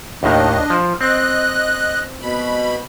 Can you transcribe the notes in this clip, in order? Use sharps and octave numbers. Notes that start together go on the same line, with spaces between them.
D#2 A2 D#3 D4 D#5
F3
C4 D#5 F#6
B2 B5